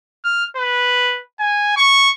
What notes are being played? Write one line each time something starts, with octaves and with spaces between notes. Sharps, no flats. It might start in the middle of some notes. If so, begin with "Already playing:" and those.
F6
B4
G#5
C#6